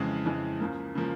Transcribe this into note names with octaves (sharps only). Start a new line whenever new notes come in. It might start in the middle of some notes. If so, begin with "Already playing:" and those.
Already playing: F2 C#3 E3 G#3
F2 C#3 E3 G#3
C#2 C#3 F3 A#3
C#3 F3 A#3